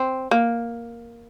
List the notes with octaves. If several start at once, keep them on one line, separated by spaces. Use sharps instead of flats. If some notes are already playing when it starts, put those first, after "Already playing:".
Already playing: C4
A#3